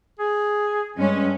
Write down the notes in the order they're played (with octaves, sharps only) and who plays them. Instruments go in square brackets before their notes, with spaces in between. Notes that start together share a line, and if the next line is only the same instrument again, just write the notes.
[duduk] G#4
[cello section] G2 C#4 [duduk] G#3